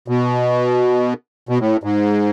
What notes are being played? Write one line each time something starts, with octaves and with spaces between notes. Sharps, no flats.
B2
B2
A2
G#2